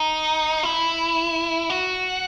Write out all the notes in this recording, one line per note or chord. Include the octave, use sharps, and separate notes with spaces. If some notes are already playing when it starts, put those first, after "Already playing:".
Already playing: D#4
E4
F#4